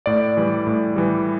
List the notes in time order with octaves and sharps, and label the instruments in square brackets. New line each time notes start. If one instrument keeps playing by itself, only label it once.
[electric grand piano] A2 D5
E3 G3
A2
E3 G3